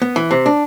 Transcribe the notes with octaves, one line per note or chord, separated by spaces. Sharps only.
B3
E3
C3
D4